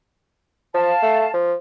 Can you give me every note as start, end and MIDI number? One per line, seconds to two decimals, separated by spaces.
0.74 0.92 53
0.74 1.30 77
0.74 1.30 81
1.02 1.26 57
1.34 1.54 53